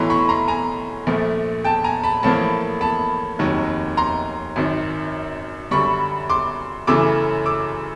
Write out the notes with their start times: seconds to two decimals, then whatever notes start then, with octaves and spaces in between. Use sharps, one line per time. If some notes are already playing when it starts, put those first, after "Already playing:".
Already playing: B1 A2 E3 A#5 C6
0.10 B5 C#6
0.29 A#5 C6
0.48 G#5 A#5
1.07 A#1 A#2 F3 A3
1.64 G5 A5
1.84 G#5 A#5
2.03 A5 B5
2.23 A1 A2 F3 A#3 A5 B5
2.81 A5 B5
3.39 F1 D#2 D#3 F#3
3.97 A#5 C6
4.56 G#1 F#2 D#3
5.71 F#2 D3 G3 B5 C#6
6.29 C6 D6
6.87 F#2 C#3 E3 A3 D6 E6
7.46 D6 E6